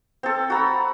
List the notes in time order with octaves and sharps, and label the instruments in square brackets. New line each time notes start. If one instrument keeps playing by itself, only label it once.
[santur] C4 A4
F#4 A#5 B5